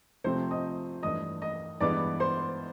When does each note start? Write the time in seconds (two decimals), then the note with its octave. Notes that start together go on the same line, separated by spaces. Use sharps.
0.24 C3 F3 A3 C4 C5 C6
0.51 D#5 D#6
1.03 G2 E3 A3 D#5 D#6
1.42 D#5 D#6
1.80 G2 E3 G#3 B3 D5 D6
2.20 C5 C6